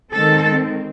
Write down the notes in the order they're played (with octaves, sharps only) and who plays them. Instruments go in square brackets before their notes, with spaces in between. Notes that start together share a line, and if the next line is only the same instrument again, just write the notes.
[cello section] D#3 G#3 C4 A4